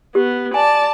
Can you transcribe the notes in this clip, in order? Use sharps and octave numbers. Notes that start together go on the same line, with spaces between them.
B3 G4
D5 G#5 A5